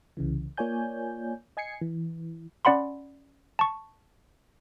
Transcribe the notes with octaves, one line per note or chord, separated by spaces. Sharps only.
C2 C#3 E3
A#3 F4 C#5 D5 G#5 G6
D#5 G#5 G#6 C7 C#7
E3
C#4 D5 F#5 B5 C6
A5 C#6